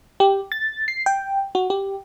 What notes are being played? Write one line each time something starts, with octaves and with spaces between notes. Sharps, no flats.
G4
A6
C7
G5
F#4
G4